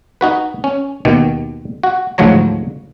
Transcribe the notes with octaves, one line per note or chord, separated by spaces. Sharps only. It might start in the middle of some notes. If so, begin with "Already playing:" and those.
D#4 F#4 B4
C#4
D#2 B2 D#3
F#4
D2 G#2 F3 F#3 C#5 A#5